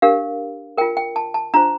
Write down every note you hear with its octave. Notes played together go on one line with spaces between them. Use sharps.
D4 G4 A#4 F5
F4 A#4 G5
G5
A5
A5
D4 F4 C5 A#5